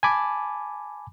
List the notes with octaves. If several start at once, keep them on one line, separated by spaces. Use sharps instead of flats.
G#5 A5 B5 D6